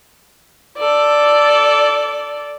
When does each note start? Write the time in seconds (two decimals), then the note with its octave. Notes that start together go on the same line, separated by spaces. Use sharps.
0.78 A4 D5